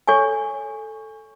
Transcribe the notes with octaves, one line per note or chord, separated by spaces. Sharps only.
A4 C#5 G#5 C#6